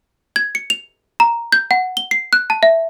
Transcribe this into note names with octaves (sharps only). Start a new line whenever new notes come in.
G#6
C#7
F7
A#5
G6
F#5
G7
C7
F#6
A5
E5